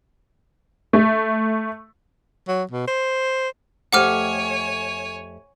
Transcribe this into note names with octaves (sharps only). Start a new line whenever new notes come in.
A3
F#3
B2
C5
F2 A3 G4 C#5 F#5 G#5 D6 F6